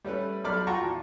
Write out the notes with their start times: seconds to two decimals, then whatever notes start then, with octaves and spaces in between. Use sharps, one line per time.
0.05 G3 A3 C#4 B4
0.44 B1 D5 B5 D6 F6
0.67 F4 F#4 G5 A5 A#5 C#6
0.83 E2